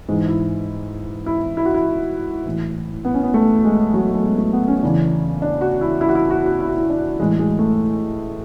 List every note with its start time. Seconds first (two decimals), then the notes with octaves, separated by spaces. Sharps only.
0.08 G#2 E3 G#3
0.28 E4
1.26 E4
1.57 E4
1.65 F#4
1.74 E4
2.45 A2 E3
3.05 B3
3.14 C#4
3.23 B3
3.34 A3
3.64 G#3
3.94 F#3
4.14 A3
4.23 G#3
4.38 A3
4.53 B3
4.68 C#4
4.82 E2 C#3 E3 D4
5.42 D4
5.61 F#4
5.81 E4
6.01 E4
6.09 F#4
6.15 E4
6.30 F#4
6.46 F#4
6.60 E4
6.68 F#4
6.77 E4
6.90 D4
7.19 A2 E3 G#3
7.39 G#3
7.59 A3